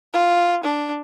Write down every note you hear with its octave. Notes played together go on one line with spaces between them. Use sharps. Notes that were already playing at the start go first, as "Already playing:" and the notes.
F4
D4